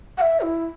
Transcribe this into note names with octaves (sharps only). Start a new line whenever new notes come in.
F#5
E5
E4